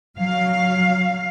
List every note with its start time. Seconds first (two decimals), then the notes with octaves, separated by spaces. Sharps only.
0.18 F#3 F5